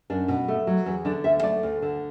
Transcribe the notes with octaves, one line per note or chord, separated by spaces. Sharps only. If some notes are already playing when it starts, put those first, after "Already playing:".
F#2 D4
B2
A3
F#3
E2
D3 D4
D2 E5
A3 D5
D2
D3